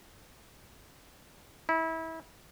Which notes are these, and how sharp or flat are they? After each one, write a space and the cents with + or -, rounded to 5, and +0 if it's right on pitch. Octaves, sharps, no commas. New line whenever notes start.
E4 -25